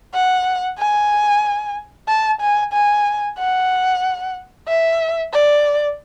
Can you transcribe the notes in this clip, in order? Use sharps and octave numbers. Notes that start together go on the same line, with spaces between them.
F#5
G#5
A5
G#5
G#5
F#5
E5
D5